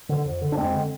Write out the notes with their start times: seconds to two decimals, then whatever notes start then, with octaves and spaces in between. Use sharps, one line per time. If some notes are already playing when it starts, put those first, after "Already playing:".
0.09 D3
0.25 F2
0.41 D3
0.52 D4
0.57 F2 G#3 C4
0.73 D3